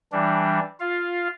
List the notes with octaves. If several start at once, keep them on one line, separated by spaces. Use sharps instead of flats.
E3 G3 D4
F4 F5